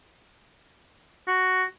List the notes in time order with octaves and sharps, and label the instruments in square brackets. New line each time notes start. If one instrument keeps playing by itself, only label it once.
[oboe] F#4